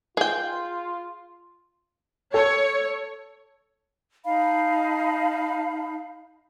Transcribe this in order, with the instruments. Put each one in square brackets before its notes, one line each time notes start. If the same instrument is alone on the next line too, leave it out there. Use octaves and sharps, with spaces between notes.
[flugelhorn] F4 [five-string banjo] G#4 G5
[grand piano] A4 [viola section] C#5
[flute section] D#4 F5 A5 B5